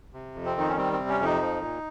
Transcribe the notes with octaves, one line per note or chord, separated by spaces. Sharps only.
C3
F2
C4
D#3 D#4
C#4
G3 C4
C4
C3
C#4
F2 D#4
F3
A#2